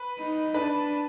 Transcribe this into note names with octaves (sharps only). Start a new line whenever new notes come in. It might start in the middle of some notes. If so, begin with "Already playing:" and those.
Already playing: B4
D#4
D4 B4